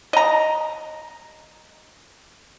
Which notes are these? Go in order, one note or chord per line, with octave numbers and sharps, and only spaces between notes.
D#5 A#5